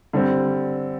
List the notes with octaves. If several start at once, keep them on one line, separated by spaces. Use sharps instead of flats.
D3 G3 C4